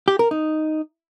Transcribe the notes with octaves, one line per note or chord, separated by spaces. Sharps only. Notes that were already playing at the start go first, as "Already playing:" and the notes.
G4
A#4
D#4